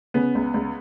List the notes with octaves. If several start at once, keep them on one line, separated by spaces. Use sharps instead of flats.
C#3 B3
C#2
C#2